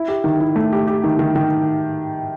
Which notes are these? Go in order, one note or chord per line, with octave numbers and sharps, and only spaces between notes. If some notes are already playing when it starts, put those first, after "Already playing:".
Already playing: E4
G4
D#3
E4
A3
G4
G4
D#3
D#3
D#3